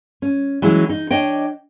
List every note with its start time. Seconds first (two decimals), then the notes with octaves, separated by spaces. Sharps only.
0.22 C#4
0.62 E3 F#3 G#3 C#4 E4
0.89 D#4
1.11 D4 C#5 D#5 G5